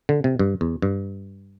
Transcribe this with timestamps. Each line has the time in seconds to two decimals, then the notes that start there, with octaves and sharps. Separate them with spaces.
0.09 D3
0.24 C3
0.39 G2
0.61 E2
0.82 G2